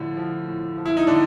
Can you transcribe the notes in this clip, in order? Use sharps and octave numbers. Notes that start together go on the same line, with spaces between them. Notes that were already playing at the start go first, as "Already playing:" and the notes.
Already playing: A2 D3 F3
F3
A2
F3
E4
D#4
A2 D3 D4